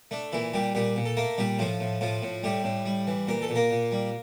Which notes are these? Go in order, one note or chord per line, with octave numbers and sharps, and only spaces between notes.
A3 D4
A#2 E3 E4
A#2 G3 G4
A#2 G3 G4
A#2
A4
A3 A#3 A#4
A#2 G3 G4
A2 F3 F4
A2
A2 F3 F4
A2
A2 G3 G4
A2
G3
E3
A#2 A#4
A4
A#2
A#3 A#4
A#2
G3